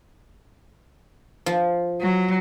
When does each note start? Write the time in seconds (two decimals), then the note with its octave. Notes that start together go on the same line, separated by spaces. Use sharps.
1.46 F3
2.01 F#3